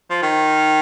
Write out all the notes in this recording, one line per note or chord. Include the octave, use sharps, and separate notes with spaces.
F3
D#3